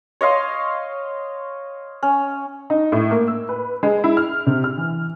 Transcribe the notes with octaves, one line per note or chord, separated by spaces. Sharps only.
C#5 D#5 F5 C6
C#4
D#4
A2
A#3
E6
B4
G#3
E4
F6
C3
F6
E3